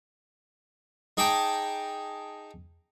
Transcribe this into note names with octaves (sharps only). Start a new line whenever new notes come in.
D#4 G#4 G5 A5 A#5 D6